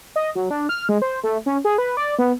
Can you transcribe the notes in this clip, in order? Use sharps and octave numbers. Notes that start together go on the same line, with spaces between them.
D#5
F#3
D4
F6
G#3
C5
A3
C#4
G#4
B4
D5
B3